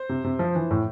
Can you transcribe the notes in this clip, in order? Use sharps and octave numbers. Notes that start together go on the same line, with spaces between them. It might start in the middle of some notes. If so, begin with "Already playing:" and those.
Already playing: C5
C3
C3
F3
E3
A2